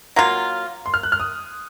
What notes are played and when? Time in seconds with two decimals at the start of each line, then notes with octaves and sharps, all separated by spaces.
0.16 F#3 A#3 F4 A#5
0.86 C6
0.94 F6
1.03 F#6
1.12 F6
1.20 D#6